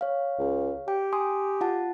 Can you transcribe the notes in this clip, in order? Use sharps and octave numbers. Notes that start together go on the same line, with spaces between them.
C#5 F5
C#2
G4 G5
G#5 C6 D#6
F4 F#5 A5